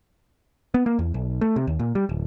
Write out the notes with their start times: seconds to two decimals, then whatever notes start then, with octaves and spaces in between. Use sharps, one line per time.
0.74 B3
0.86 A#3
0.99 E2
1.14 B1
1.41 A3
1.56 C3
1.67 D#2
1.79 A#2
1.95 G3
2.09 D1